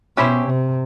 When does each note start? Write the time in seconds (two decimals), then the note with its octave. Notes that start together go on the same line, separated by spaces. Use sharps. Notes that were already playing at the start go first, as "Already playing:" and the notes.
0.17 B2 C#4 E4 G4 C5
0.46 C3